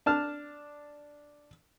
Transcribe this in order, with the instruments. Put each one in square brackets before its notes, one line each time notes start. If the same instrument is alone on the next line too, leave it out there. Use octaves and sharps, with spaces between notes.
[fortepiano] D4 A5 F6